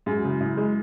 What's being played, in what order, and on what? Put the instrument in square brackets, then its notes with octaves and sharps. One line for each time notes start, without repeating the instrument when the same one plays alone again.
[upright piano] F#2 [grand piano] G#3 G#4
[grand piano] F#4
[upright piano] C#3
[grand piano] E4
[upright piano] F#2 [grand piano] E4
[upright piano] G#3